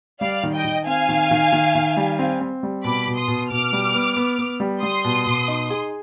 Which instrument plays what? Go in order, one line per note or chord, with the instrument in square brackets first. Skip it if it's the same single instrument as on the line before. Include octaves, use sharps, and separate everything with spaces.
[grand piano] G3 [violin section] D5 F5
[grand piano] D#3
[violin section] D#5 G5
[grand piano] D#3
[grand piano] C4 [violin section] F5 G#5
[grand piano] D#3
D#3
D#3
D#3
G3
C4
C4
G3
[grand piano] B2 [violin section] B5 D6
[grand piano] B2
[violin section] C6 D#6
[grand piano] B2
[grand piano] B2 [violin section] D6 F6
[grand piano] G3
B3
B3
B3
G3
[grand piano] G3 [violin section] C6 D#6
[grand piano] B2
B2
D#4
G#4